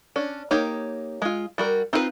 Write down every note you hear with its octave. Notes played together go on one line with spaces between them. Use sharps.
C#4 D4
A#3 D#4 G4 C#5
G#3 F4
G3 F#4 A#4
C4 D#4 F4 G#4 B4